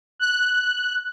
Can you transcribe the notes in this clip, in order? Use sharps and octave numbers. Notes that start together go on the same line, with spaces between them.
F#6